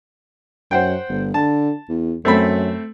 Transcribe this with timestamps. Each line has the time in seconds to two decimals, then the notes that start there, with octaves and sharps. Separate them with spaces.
0.71 F#2 C5 F#5 G5
1.09 G1
1.34 D3 A5
1.89 E2
2.25 F#2 A3 C4 B5